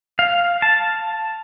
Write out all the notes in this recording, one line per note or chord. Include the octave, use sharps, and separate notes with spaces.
F5
A5